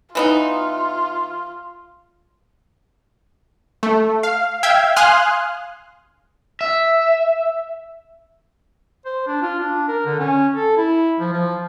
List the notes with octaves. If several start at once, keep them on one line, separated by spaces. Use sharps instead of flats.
E3 B3 D#4 F4
A3
F5
E5 F5 G5 G#6
F5 G#5 C6 D#6 F6 F#6
E5
C5
D4
F4
D4
A#4
D3
C#4
A4
E4
F3
F3